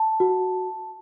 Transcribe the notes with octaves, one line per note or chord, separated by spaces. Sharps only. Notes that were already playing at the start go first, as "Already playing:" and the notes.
Already playing: A5
F#4